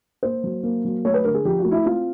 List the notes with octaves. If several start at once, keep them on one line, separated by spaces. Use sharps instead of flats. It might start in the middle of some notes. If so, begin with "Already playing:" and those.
A#3 C5
F#3
A#3
F#3
A3 C#5
B4
D3 A#4
G#4
F3 G4
F#4
A3
E4
C4 F4